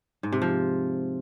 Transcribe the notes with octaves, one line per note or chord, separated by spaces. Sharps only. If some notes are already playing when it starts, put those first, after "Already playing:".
G#2
C3
F3